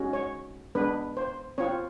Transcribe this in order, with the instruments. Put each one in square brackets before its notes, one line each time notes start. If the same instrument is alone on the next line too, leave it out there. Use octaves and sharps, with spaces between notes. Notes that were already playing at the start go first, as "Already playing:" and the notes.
Already playing: [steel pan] G#3 C#4 F#4
C#5
G#3 B3 D4 B4
C5
C4 F4 C#5